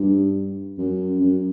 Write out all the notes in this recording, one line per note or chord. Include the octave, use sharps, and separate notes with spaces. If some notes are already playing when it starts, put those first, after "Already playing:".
Already playing: G2
F#2
F#2